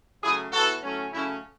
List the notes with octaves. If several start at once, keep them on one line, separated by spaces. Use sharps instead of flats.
C#3 F#3 A3 E4 G#4
A2 E3 B3 F#4 A4
A2 F#3 A3 C#4
C#3 F#3 A3 C#4 E4